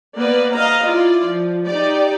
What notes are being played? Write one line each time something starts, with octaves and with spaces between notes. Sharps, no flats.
A#3 B3 B4 D5
D#5 F5 A#5
E4 F4 D5
F3
D#4 G4 D5